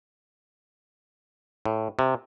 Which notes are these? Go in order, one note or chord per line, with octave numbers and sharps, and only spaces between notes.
A2
C3